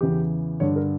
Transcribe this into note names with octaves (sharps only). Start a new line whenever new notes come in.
E2 C#3 E3 G4
G2 D3 C#5
A#4